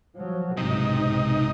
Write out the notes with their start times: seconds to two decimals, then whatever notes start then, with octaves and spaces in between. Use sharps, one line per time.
0.15 F3 F#3
0.57 B1 G#2 C3 D#4